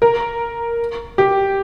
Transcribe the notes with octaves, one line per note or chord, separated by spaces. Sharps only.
A#4
G4